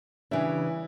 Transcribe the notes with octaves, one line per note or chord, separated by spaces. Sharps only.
C#3 E3 G3 D4 E4